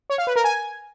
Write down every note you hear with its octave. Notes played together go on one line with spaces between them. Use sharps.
C#5
F5
B4
A#4
G#5